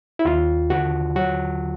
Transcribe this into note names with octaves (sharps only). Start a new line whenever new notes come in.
E4
D#2 F4
D3 F#4
F#3 F#4